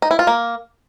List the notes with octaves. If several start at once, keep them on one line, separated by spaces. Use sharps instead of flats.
D#4
E4
F4
A#3